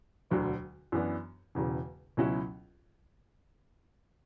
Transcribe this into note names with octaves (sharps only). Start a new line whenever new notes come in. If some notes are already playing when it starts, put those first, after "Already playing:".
E1 D2 D3 F#3
F#2 E3 B3 D4
E1 E2 C#3
C#2 B2 F#3 C#4 E4